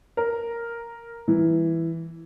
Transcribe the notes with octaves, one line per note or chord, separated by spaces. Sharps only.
A#4
E3